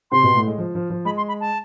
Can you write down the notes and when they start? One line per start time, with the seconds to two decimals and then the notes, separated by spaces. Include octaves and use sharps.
0.12 C3 C4 C6
0.23 B2 B3
0.35 A2 A3
0.47 G#3
0.58 F3
0.75 F3
0.90 F3
1.05 G#3 B5
1.17 C6
1.28 B5
1.40 A5